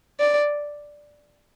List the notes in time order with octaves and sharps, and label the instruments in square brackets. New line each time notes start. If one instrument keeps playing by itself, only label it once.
[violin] D5